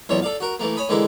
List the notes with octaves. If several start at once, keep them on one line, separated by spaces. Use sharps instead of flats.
B1 E2 A#2 C#5 E5
A4 D5 F5
F#4 A#4
E3 A3 A#3
C#5 G#5 B5 D#6
D3 E3 G#3 A#3 E4